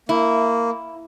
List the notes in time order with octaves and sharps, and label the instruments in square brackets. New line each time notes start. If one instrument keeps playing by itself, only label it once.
[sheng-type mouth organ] A#3 [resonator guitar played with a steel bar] E4